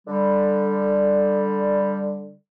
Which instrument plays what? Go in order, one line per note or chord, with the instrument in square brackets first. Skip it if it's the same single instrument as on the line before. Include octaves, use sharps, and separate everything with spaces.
[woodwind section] D3 G3